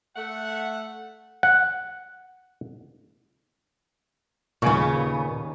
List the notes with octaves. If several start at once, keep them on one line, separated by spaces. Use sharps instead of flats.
A3 F#5
F#5
D#2 A#2 C#3 B3 G#5 C#6